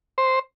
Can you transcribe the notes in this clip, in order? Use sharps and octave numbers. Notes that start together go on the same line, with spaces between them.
C5